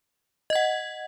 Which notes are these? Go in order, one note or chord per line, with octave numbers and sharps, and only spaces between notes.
D#5 F#5 G#6